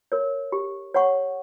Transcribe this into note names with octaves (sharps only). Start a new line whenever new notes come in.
A#4 C#5
G4
C#5 F#5 C#6